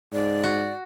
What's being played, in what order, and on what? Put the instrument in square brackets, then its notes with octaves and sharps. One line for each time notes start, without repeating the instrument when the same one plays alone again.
[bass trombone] G#2 [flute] D5
[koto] F#4